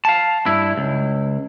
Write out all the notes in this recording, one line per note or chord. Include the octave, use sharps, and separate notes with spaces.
F5 A5
G2 E4
C#2